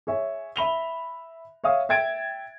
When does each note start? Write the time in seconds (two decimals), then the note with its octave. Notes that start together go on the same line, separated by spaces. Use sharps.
0.07 G#4 C#5 E5
0.56 E5 B5 F7 G7
1.64 C#5 E5 F5 D#6
1.89 E5 G5 G#6 A6 D7